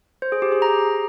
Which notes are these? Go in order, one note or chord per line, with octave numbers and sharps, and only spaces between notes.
C5
G#4
G4
G#4
A#5